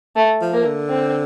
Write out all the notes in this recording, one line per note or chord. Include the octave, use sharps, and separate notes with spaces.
A3
F3
A#3
D3
C4